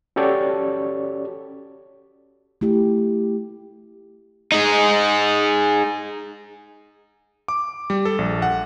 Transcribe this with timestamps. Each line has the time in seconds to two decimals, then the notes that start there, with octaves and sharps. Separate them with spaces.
0.16 C#4 F#4 G4 A4 C#5 D5
2.61 A3 E4 G4
4.52 D#4 G#4
7.48 D6
7.90 G3
8.05 A4
8.18 A#1
8.42 F#5